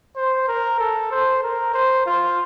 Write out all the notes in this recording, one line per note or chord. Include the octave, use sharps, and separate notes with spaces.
C5
A#4
A4
C5
A#4
C5
F4